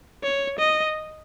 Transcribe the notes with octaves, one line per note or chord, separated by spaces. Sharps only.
C#5
D#5